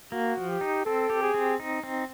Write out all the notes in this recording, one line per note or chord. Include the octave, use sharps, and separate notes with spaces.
A#3 F#4
F3
G4
D#4
C4 A4
G4
G#4
C4
D#4
C4